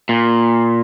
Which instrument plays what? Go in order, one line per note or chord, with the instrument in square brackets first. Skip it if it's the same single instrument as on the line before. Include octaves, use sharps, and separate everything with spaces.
[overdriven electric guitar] A#2